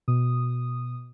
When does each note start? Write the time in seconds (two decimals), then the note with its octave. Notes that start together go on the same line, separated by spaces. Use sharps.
0.08 B2 D#6